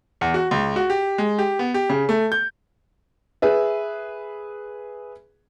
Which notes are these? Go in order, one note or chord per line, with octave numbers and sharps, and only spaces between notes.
E2
F#4
C#2
F#4
G4
G#3
G4
B3
G4
C#3
A3
G6
G#4 B4 E5